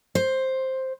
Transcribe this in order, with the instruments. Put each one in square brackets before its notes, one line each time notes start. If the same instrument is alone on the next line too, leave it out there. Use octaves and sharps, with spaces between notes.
[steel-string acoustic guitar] C5